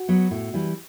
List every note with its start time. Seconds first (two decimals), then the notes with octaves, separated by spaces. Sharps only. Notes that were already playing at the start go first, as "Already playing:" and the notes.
Already playing: F#4
0.08 F#3 B3
0.31 A2
0.54 E3 G3